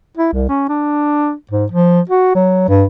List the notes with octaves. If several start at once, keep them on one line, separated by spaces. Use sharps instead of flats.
E4
C2
C#4
D4
G#2
F3
F#4
F#3
G2